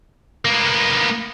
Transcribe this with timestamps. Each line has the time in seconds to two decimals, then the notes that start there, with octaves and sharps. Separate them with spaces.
0.45 A#3 B3